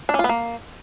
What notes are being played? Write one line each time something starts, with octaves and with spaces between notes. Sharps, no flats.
D4
C#4
F4
B3
A#3